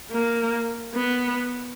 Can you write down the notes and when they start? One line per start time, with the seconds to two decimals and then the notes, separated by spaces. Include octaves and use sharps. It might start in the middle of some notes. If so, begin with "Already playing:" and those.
0.11 A#3
0.95 B3